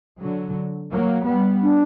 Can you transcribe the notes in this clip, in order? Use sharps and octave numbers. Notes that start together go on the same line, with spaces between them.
D3 F#3
F#3 A#3
G3 B3
D4